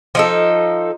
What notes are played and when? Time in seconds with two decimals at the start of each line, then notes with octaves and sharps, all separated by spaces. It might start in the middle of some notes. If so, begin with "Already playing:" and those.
0.15 F3 D#4 A4